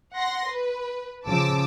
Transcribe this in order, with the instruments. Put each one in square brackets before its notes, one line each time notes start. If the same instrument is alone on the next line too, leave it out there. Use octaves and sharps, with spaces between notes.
[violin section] F#5 C6 A#6
B4
[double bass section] C#3 F3 [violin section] A5 D6 E6